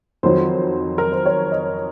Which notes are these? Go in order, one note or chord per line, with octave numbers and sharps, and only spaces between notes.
F2 D#3 F#3 C5
A#4
C5
C#5
D#5